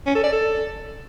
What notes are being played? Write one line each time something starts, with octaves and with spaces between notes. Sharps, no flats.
C#4
A4
D5
A4